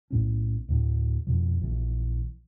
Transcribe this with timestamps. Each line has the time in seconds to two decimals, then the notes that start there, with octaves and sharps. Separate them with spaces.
0.11 B1 A2 C#4
0.68 D2 A2
1.27 F2 B2 F3
1.61 A#1 E3